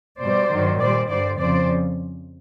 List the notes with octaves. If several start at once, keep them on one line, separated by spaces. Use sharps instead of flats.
B2 G3 C5 D5
G2 D#3 F#3
A#2 G3 C5 D5
G2 D3 G3 C5 D5
F2 C#3 F3 C5 D5